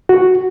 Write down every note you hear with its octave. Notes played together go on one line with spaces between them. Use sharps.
F#4